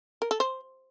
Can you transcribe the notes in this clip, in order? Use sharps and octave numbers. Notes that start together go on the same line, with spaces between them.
A#4
A4
C5